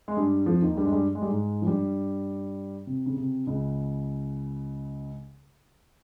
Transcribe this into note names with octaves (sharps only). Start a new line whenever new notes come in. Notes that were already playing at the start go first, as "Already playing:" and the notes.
G#3
G2 G3
F2 F3
D#2 D#3
G2 G3
G#3
G2 G3
G#3
G3
G#2 G#3
F3
G2 G3
C3
C#3
C3
C#2 C#3